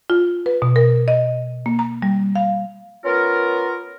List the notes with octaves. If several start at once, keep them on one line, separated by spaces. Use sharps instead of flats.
F4
B4
B2
A#4
D#5
A#3
A#5
G3
F5
B3 C#4 F4 A#4